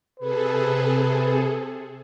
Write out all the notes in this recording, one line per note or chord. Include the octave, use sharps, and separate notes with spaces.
C3 G#4 A4 B4